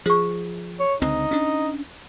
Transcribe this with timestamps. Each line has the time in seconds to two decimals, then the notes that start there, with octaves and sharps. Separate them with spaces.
0.06 F3 G#4 C#6
0.80 C#5
1.02 C#2 D3 C4 D#4
1.31 C#4 D4